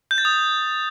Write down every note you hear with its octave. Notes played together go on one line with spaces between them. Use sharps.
G6
A6
D#6